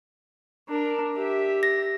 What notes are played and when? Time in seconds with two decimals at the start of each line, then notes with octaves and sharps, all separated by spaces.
0.68 D4 A#4
1.15 G4 E5
1.63 A#6